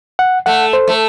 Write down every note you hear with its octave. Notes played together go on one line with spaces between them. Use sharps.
F#5
A3 F#5
C5
A3